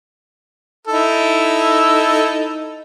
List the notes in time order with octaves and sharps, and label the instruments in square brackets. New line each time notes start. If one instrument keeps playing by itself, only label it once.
[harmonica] D#4 E4 A4